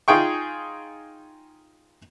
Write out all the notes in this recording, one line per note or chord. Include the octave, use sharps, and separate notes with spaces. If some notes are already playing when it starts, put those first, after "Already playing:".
D#4 F4 G#4 G5 C#6